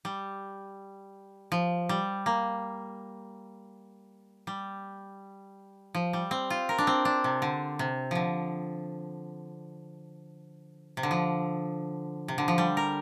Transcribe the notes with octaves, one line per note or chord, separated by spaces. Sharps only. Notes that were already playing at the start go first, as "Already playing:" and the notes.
G3
F3
G3
A#3
G3
F3
G3
C4
F4
A#4
D4
C4
D4
C3
D3
C3
D3 F3
C3
D3
F3
C3
D3
F3
G3
A#4